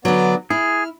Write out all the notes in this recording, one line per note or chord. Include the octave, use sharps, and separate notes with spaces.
D3 F#3 B3 D5
E4 G#4 F6